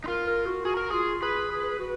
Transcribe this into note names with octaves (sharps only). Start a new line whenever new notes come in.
D#4
F4 A#4
A#4
F#4
F#4 G#4
A#4
F4 G#4
G#4 B4
G#4
F#4